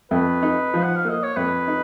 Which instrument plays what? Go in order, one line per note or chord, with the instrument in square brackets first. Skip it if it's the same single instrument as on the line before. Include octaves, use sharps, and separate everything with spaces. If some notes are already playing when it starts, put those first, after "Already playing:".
[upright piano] F2 [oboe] B4
[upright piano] D#4
F3
[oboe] F#5
F5
[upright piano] A#3 [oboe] D#5
[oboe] C#5
[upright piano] F2 [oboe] B4
[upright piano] D#4